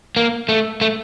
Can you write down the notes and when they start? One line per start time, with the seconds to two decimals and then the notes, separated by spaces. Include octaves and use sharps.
0.17 A#3
0.49 A3
0.81 A3